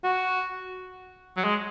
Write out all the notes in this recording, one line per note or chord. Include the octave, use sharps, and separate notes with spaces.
F#4
F#3
G#3